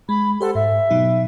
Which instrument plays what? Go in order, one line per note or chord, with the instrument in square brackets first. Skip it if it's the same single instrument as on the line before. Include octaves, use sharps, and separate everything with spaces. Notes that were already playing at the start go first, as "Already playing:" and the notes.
[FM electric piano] G#3 [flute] B5
[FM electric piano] G4 C5 F#5 [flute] A4
[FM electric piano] G#2 [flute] E5
[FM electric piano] B2 F#3 D#4